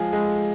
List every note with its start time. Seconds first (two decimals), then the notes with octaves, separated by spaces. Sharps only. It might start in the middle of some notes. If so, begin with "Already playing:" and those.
Already playing: F3 G#3 G#4
0.13 G#3